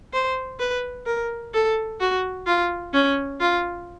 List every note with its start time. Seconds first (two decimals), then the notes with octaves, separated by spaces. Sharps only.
0.13 C5
0.59 B4
1.06 A#4
1.54 A4
2.00 F#4
2.46 F4
2.93 C#4
3.40 F4